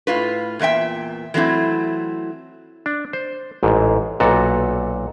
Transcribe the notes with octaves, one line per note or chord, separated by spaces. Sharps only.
A2 F4 B4
E2 A#2 A3 E5 G5
E3 F#3 A3 C4 E4
D4
C5
A1 G#2
B1 A#2 F#4 A4